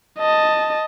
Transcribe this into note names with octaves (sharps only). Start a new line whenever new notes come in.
D#5 A5